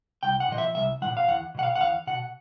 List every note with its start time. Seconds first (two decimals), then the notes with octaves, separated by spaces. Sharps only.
0.23 C2 G5
0.40 F#5
0.49 A#2 F3 D#5
0.58 E5
0.75 C2 E5
1.02 F3 F#5
1.05 A#2
1.17 F5
1.28 E2 F#5
1.55 B2 F#5
1.63 F5
1.75 F#5
1.81 E2 F5
2.07 B2 F#5